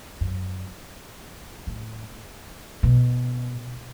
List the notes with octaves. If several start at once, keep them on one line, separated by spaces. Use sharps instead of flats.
F#2
A2
B2